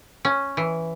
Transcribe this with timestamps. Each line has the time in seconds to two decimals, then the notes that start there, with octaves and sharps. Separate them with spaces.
0.25 C#4
0.57 E3